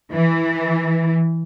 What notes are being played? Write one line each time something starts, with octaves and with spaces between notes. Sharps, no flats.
E3